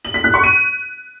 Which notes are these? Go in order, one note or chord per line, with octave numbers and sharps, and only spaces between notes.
F#7
B6
F#6
C#6
D#7